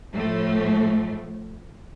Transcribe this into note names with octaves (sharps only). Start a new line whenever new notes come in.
A2 F3 A3